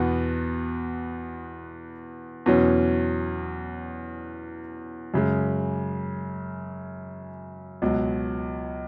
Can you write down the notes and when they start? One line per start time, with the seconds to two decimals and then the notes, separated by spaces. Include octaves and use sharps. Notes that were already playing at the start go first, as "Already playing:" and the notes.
Already playing: E2 B2 B3 F#4
2.46 E2 B2 F#3 C#4
5.14 F#2 C#3 G#3
7.82 C#2 B2 F#3